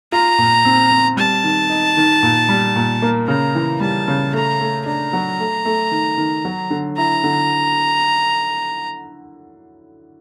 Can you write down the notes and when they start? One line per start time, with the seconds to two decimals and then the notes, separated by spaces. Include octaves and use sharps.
0.12 F4 A#5
0.38 A#2
0.65 C4
0.91 C4
1.17 G3 A5
1.44 D#3
1.70 D#4
1.97 D#3
2.23 A#2
2.49 G3
2.76 A#2
3.02 A#3
3.28 C#3 A#5
3.55 E3
3.80 G3 A5
4.08 C#3
4.33 A3 A#5
4.60 A3
4.86 D4 A#5
5.13 F#3
5.40 A3
5.65 A3
5.91 D#3
6.18 D#3
6.45 F#3
6.70 D3
6.97 E4 A#5
7.24 D3